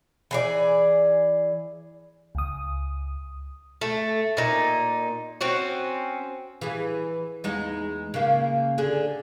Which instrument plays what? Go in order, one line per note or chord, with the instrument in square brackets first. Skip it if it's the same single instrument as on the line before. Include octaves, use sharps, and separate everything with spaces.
[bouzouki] E3 G#4 D5
[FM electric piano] C#2 D#6
[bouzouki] A3
A#2 D#4
C4 C#4 F#4
[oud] E3 G#4
E2 G#3 D#4
C#3 A#3
D3 G#4